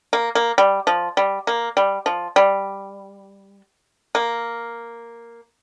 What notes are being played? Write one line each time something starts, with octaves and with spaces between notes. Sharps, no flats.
A#3
A#3
G3
F3
G3
A#3
G3
F3
G3
A#3